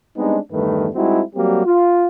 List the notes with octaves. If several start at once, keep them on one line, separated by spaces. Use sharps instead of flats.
G3 G#3 B3 C4 D4 D#4
E2 G2 D#3 G3 A3 B4
G3 G#3 C4 D#4 E4 F#4
F#3 G3 A#3 C4 F#4 G4
F4